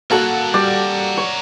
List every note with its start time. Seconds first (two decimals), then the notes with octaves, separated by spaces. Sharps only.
0.11 A#3 F#4 A4 A#4 F#5
0.54 G3 D5
1.17 C#5